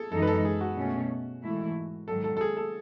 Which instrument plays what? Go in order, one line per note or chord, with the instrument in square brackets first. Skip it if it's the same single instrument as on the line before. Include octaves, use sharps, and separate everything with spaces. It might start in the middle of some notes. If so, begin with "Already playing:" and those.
Already playing: [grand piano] G#4 A4
[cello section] F#2 E3 G#3 D#4 [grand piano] A4
[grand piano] B4
A4
G#4
F#4
[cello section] B2 A3 C#4
G#2 E3 A3 E4
[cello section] G#2 D#3 F#3 [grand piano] A4
[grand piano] A4
A4
G#4
A4